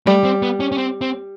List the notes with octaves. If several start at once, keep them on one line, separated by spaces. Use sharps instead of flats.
G3 A3
C4
B3
C#4
C#4
C4
C4